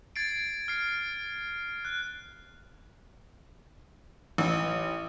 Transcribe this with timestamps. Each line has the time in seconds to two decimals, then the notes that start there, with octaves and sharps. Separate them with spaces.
0.16 G#6 A6 C7 D7
0.68 F6 C7
1.85 F#6
4.38 A1